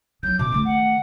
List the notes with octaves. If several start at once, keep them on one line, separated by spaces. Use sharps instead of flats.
F#3 D#4 G6
B2 D6
D#3 A3
F#5